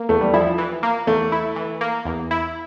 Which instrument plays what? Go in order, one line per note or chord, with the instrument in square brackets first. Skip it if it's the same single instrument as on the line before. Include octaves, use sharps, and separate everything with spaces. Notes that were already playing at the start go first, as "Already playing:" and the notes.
Already playing: [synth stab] A#3
[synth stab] E2 [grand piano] A3
[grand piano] G3
[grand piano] F3 [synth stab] E4
[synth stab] E3
A#3
[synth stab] E2 [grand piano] A3
[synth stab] E4
E3
A#3
E2
E4